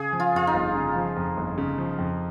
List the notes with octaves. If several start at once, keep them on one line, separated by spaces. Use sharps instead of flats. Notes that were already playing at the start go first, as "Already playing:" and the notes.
Already playing: C#3 G#4
F3
F4
F2 F4
D#4
G1
C#3
F3
F2
G1
C#3
F3
F2